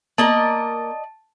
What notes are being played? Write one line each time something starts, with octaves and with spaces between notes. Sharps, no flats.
A#3 A#4 D5 D#5 A5